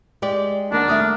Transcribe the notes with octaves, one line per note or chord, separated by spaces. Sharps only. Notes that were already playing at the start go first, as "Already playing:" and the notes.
G#3 G4 D5
D#2 D4 A#4 F#5
G3 A3 E5 D6 D#6 F6